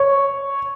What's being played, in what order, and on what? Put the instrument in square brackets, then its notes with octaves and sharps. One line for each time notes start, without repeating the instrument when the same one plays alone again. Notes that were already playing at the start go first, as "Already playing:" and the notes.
Already playing: [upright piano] C#5